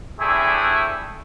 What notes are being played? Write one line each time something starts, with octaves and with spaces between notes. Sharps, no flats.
A3 C4 D4 E4 G4 G#4